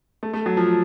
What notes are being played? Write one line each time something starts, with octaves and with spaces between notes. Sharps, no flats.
A3
A3
F#3
F3